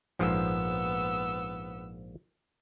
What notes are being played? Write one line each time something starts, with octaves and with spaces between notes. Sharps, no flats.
A#1 G#2 F3 B3 E6